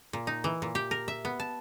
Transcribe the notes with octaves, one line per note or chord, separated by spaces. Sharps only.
A#2
D#4
E3
A#2
G4
A#4
E5
B3
A5